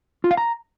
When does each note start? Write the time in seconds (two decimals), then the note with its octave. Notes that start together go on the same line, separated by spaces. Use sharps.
0.24 F4
0.31 F5
0.37 A#5